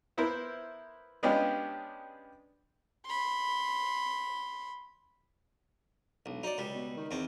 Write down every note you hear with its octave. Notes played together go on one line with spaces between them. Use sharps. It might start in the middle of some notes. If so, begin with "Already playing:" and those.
B3 E4 A#4 C5 E5
G#3 B3 C#4 D4 F4 G4
B5 C6
E1 B1
F#3 D#4 D5
C#2 G3
B2
D#3
E2 C4